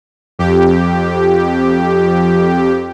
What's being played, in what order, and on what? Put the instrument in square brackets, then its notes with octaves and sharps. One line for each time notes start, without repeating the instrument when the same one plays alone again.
[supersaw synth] F2 G4